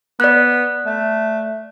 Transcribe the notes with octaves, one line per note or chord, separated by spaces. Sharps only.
B3 D5 F#6
A3